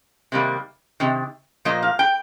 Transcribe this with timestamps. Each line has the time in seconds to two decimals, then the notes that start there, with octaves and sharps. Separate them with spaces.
0.32 C3 D#3 G3 A#3
1.00 C3 D#3
1.65 A#2 F3 A#3 D#5
1.83 F5
1.99 G5